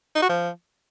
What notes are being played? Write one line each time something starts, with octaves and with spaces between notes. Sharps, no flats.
D#4
F#4
F3